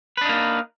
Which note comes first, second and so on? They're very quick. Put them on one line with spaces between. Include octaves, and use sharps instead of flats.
B4 D4 D#4 A#3